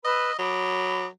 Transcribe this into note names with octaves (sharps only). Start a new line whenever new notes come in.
B4 D#5 B5 E6
F#3 B5 D6 D#6